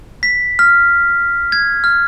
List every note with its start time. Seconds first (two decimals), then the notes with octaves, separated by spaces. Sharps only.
0.23 B6
0.59 F6
1.52 G#6
1.84 F6